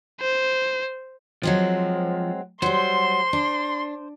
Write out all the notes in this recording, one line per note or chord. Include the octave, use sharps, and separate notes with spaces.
C5
F3 F#3 G#3 C4
F#3 G3 C5 C6
D4